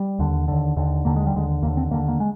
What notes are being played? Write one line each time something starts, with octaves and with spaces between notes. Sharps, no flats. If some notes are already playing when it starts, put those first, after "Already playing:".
Already playing: G3
D#2 D3
D#2 D3
D#2 D3
D#2 D3 A#3
G#3
G3
D#2 D3 G#3
D#2 D3 A#3
C4
D#2 D3 A#3
A#3
G#3